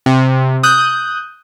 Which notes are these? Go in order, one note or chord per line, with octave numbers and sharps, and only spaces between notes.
C3
D#6 F#6 G6